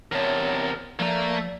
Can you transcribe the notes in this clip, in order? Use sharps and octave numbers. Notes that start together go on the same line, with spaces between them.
E2 C3 A#4 C#5 A5
F3 A3 A#3 D5 A#5